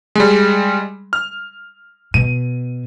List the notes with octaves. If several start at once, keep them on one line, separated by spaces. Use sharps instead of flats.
G3 G#3
F6
B2 D#7